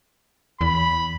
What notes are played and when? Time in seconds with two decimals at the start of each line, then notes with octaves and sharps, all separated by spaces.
0.61 E2 B5